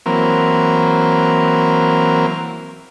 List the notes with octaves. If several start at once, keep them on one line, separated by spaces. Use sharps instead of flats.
E3 F#3 A#3 C4 A#4